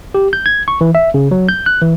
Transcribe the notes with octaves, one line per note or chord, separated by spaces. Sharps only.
G4
G6
G#6
C#6
E3
E5
C#3
F#3
G6
F#6
E3